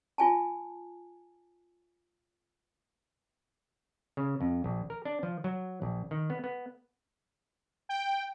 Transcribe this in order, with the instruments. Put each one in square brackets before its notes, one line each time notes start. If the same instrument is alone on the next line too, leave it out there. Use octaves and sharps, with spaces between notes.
[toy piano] F4 G#5 A5
[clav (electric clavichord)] C#3
F2
A#1
A#4
D4
F3
F#3
A#1
D#3
B3
B3
[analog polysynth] G5